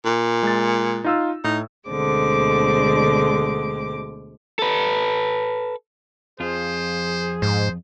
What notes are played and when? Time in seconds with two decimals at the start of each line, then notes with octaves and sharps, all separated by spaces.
0.06 A#2
0.43 G#3 A6
1.04 D#4 F4 E6
1.44 A2 D#4
1.88 D2 B2 D3 G#3 C4 D6
4.59 A4 B4
6.40 F2 F3 F4 G#4 C5
7.42 G#2 C5